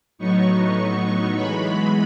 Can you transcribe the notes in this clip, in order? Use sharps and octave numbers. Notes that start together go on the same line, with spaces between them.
A2 F#3 B3 D#4 C#6
E3 G#3 B3 B5